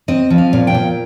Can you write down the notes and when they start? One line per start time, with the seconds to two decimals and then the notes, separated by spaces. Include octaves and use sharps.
0.08 C4 D#5
0.30 F3
0.38 F5
0.53 A#2
0.67 G5
0.74 A#2